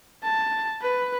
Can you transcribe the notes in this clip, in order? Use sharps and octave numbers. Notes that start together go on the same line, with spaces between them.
A5
B4